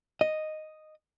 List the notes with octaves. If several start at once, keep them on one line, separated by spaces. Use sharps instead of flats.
D#5